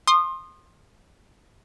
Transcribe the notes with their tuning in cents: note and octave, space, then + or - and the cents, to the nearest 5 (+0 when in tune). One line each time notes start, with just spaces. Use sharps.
C6 +20 D#6 -25